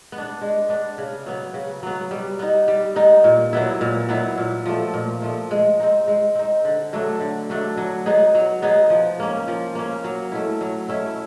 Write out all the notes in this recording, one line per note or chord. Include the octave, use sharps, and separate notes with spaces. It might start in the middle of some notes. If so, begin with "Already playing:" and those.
B3
D4
G#3
B3 D4
C#3
F#3 B3
C#3
F#3 B3
G3
B3 D#4
G3
B3 D#4
A#2
F#3 B3 E4
A#2
F#3 B3 E4
A#2
F3 A3
A#2
F3 A3
G#3
C4 D#4
G#3
C4 D#4
D3
F#3 A3 D4
D3
F#3 A3 D4
F#3
B3 D#4 G#4
F#3
B3 D#4 G#4
F3
A#3 C#4
F3
A#3 C#4
F#3
A3 C#4 E4
F#3
A3 C#4 E4